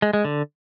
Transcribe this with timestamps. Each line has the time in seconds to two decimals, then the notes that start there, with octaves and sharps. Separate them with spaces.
0.02 G#3
0.13 G#3
0.25 D3